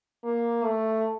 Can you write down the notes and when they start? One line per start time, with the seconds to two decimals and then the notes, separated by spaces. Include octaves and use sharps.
0.24 A#3
0.64 A3